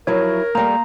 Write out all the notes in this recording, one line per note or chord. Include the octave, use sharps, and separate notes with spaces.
F3 F#3 E4 A#4 C#5
G3 A3 A#3 A#5